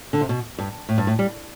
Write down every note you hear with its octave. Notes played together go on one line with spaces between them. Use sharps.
D3
C3
B2
G2
A2
G2
A2
G3